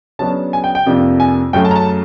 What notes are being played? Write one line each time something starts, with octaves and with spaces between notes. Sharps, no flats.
C#3 F#3 B3 D4 A5
G#5
G5
G5
F2 C3 F3 A#3 D4
G#5
F#2 C#3 F#3 A3 G5
A5
A#5
A5